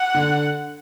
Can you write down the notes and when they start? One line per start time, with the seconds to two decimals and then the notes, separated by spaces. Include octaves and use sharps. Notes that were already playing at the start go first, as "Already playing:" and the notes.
Already playing: F#5
0.14 D3